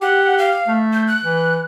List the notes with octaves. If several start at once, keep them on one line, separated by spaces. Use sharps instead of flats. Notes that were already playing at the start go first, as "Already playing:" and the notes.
G4 F#5
F5
A3
G6
F#6
E3